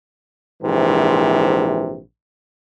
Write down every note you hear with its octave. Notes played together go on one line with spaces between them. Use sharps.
A#1 G#2 C3 E3